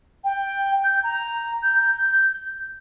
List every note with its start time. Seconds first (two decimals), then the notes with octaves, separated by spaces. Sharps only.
0.24 G5
0.84 G6
1.04 A#5
1.63 G6